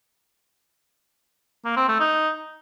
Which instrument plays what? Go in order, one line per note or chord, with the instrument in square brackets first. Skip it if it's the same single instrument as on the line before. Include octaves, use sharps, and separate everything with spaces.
[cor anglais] A#3
C4
A3
D#4